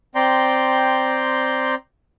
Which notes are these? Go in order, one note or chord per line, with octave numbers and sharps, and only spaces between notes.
C4 D5 G5 A#5 C6